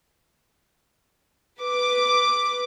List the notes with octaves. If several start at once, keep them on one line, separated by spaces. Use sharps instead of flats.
B4 D6